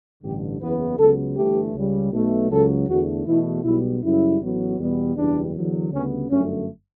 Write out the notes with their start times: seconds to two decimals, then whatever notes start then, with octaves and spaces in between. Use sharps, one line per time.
0.22 A1 G2 D3 G4
0.60 F#1 E2 C#3 E3 B3 B4
0.98 C#2 C#3 F#3 B3 A4
1.36 G1 G2 E3 A3 G4
1.74 C#2 C#3 G3
2.12 B1 B2 A3
2.50 C#2 C#3 F#3 A4
2.88 E2 D3 A3 F#4
3.26 E2 B2 A3 E4
3.64 B1 B2 G3 B3 E4
4.02 F#2 C#3 G3 E4
4.40 A1 A2 F#3 B3
4.78 E2 B2 G3 B3
5.16 F#1 E2 B2 G3 D4
5.54 E2 D3 F#3
5.92 D2 C#3 G3 B3 C#4
6.30 G1 F#2 D3 A3 C#4